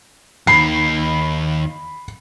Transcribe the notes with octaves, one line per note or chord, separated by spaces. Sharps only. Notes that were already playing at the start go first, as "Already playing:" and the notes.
D#2 D#3 B5 C7